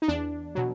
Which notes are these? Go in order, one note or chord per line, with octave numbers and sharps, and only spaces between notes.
D#4
E2 D4
B2 F#3